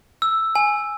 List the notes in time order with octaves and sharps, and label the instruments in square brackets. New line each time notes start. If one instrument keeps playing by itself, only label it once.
[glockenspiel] E6
G#5